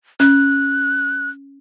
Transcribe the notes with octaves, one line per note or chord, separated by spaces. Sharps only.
C#4 F#6